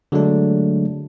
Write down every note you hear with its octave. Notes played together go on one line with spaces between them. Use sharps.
D3 F#3 G#3 A3 D4